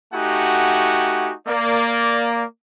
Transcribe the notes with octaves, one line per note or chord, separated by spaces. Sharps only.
A3 D#4 F#4 G4 F#5 G#5
A#3 D5